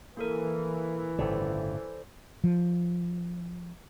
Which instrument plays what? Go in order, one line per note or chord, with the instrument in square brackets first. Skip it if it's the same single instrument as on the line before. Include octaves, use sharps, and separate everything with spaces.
[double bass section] E3 [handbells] A#3 A4 A#4
[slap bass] G1 A2 C#3 [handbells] A4 C5 D5
[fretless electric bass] F3